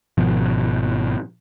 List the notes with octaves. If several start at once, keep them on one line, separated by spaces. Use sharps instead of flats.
G#1 B2 F3